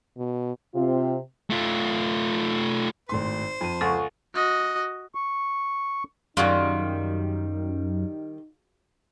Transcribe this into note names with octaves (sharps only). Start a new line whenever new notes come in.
B2
C3 C4 F4
A3 F4
G#1 A2 C5 C6
F2 D#7
C#2 A4 F#5 C#6
F#4 D#5
C#6
F#2 D#3 G3 D#4 F4 F#4 G#4